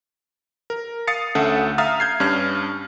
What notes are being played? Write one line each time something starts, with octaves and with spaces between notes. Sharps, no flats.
A#4
F5 D#6 A6 C7 C#7
D2 C#4 A4 E5 F#5 D#6
E5 F5 A#5 D#6 F6 A6
G6 G#6 C7
G2 C#4 D4 F6